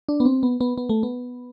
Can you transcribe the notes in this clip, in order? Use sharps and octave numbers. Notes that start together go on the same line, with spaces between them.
D4
B3
C4
B3
B3
B3
A3
B3